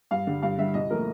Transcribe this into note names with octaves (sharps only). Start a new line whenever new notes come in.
G2 F5
D3 G3
G2 F5
D3 G3 E5
C2 D#5
A#2 F3 A3 A#4